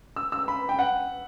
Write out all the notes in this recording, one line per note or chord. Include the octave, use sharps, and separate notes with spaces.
E6
E6
B5
G5
F#5